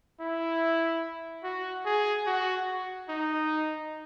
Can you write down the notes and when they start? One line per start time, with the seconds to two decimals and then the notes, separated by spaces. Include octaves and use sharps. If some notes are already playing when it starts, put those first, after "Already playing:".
0.20 E4
1.44 F#4
1.85 G#4
2.26 F#4
3.09 D#4